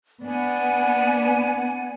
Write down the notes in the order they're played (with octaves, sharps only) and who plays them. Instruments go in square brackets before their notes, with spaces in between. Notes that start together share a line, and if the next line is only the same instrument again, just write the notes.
[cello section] B3 [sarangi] D4 [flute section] F#5 G#5